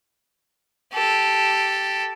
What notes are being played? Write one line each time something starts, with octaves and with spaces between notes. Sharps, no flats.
G4 A4